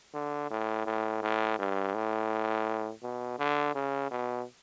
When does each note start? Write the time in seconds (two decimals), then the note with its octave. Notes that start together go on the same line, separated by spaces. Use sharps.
0.14 D3
0.50 A2
0.86 A2
1.22 A2
1.59 G2
1.94 A2
3.03 B2
3.39 D3
3.75 C#3
4.11 B2